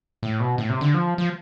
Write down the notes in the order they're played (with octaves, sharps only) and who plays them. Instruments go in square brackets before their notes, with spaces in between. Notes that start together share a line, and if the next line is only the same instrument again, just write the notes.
[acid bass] A2
B2
A2
C3
D3
F3
F3